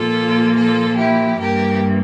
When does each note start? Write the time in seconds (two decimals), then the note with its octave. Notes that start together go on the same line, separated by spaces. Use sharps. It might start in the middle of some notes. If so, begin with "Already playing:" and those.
Already playing: A#2 F3 A#3 F4 A4
0.57 F4 A4
0.97 E4 G4
1.39 G2 E3 G3 A#3 G4 A#4